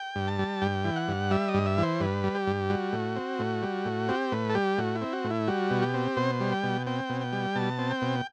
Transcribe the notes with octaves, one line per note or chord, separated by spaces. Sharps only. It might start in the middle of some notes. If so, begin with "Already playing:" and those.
Already playing: G5
G2
A5
G3
G2 G5
E3
F#5
G2
G3 E5
D#5
G2
E5
E3
C5
G2 B4
G3
G4
G2
G3 F#4
A2
C4
A2
G3
A2
C4 G4
A2 B4
A4
G3 G4
A2 F#4
E4
C4
F#4
A2
E4
G3 F#4
B2
G4
C4
B2 C5
G3
G5
B2
C4 G5
B2
G5
G3
B2 A5
C4
G5
B2